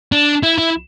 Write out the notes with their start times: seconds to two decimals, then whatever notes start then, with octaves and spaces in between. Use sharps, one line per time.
0.12 D4
0.43 E4
0.58 E4